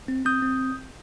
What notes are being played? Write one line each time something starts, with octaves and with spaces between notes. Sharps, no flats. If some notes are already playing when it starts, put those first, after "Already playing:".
C4
C4 D#6 G6
C4